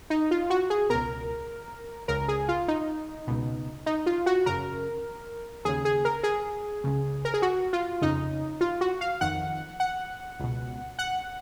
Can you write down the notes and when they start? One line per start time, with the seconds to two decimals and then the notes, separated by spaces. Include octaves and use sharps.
0.10 D#4
0.31 F4
0.50 F#4
0.70 G#4
0.89 C#2 B2 A#4
2.08 C#2 C#3 A#4
2.28 G#4
2.48 F4
2.68 D#4
3.27 C#2 B2
3.86 D#4
4.06 F4
4.26 F#4
4.46 F#2 C#3 A#4
5.65 D#2 C#3 G#4
5.85 G#4
6.05 A#4
6.23 G#4
6.84 C#2 C#3
7.25 A#4
7.34 G#4
7.42 F#4
7.73 F4
8.01 F2 C#3 D#4
8.61 F4
8.81 F#4
9.01 F5
9.21 F2 D#3 F#5
9.80 F#5
10.40 C#2 B2
10.99 F#5